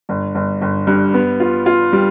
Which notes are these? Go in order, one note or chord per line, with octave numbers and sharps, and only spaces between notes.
G1
G1
G1
G2
B3
F4
F4
G3